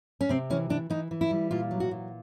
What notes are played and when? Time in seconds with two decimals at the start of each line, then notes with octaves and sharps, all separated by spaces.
0.21 C#4
0.29 C3 C4
0.50 E3 C#4
0.69 E3 D4
0.90 E3 D#4
1.11 E3
1.21 E4
1.31 G3
1.51 A#2 F4
1.71 F#3
1.80 F#4
1.91 A#2